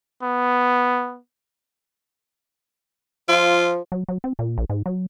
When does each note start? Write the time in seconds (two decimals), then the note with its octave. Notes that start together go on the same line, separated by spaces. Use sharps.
0.23 B3
3.29 F3 F4
3.92 F#3
4.09 F#3
4.24 C4
4.39 A#2
4.58 A#1
4.70 G#2
4.86 F#3